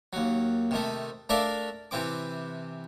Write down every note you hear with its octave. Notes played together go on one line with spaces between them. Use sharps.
D#2 F#3
C3 D#3 A3
A3 D4 A#4 D5 E5 F5
C3 E3 C4 D6